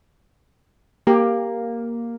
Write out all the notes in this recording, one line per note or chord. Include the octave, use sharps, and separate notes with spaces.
A#3 G4